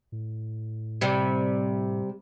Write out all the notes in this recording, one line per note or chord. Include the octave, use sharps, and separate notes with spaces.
A2
C3 G3